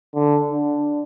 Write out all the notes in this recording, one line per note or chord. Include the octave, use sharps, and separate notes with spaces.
D3
D4